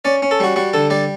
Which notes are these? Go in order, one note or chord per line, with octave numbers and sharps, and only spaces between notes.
C#4 D5
C#4
A4
G3 F#4
G3 F#4
D3 A4
G3 D5